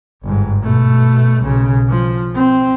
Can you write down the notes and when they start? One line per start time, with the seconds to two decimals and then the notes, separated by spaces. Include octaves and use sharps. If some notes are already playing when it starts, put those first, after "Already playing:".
0.24 G1 G#2
0.63 B2 A3
1.42 B1 C#3
1.89 F3
2.35 C4